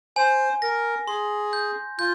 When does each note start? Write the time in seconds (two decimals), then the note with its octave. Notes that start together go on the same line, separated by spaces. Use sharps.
0.16 C5 G#5
0.62 A#4 A#6
1.08 G#4 C6
1.53 G6
1.99 F4 G6